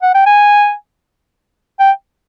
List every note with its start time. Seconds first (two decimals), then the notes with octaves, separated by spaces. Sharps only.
0.02 F#5
0.14 G5
0.26 G#5
1.79 G5